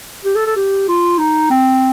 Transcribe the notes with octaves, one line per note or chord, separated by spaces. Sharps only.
G4
A4
A4
G4
F4
D#4
C4